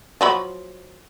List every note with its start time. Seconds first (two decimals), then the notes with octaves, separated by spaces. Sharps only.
0.21 F3 F#3 B5